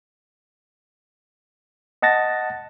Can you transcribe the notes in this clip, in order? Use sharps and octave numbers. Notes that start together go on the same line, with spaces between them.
D#5 F#5 A5 A6 A#6